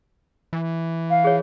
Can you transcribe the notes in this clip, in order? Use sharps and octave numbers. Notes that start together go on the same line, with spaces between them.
E3
F5
G#4 C#5